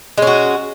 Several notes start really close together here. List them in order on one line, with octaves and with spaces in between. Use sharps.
G#3 C#4 F#4